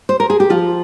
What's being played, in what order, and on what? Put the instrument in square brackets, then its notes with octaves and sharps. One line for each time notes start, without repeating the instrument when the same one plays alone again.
[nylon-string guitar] C5
A#4
G#4
G4
F3 F4